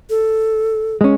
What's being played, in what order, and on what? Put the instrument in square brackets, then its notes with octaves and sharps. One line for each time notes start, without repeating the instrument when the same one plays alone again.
[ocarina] A4
[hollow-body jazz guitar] G#3 C#4